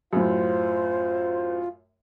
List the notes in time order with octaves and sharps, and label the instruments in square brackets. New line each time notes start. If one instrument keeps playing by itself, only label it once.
[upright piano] F#2 A2 [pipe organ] F4 [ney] C5